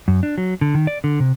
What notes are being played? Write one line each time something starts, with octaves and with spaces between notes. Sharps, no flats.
F#2
D4
F#3
D3
D#3
D5
D3
C3